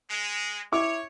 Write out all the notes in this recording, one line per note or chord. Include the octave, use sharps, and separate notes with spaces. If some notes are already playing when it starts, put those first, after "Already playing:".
G#3
E4 C#5 D6